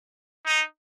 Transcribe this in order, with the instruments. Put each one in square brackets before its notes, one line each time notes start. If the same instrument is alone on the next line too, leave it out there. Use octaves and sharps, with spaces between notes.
[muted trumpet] D#4